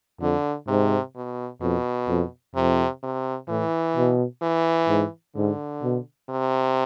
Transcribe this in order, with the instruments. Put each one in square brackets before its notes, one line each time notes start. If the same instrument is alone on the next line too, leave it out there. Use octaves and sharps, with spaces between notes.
[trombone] F2 [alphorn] D3
[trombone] G#2 [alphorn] C3
[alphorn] B2
[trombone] F2 [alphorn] B2
[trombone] F2
[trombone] F2 [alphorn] C3
[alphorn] C3
[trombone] A2 [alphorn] E3
[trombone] B2
[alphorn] E3
[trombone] G#2
[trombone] G#2 [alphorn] D3
[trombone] B2
[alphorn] C3